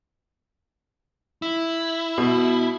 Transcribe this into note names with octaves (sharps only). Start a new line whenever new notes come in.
E4
B2